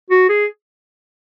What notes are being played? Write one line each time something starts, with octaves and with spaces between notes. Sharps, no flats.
F#4
G#4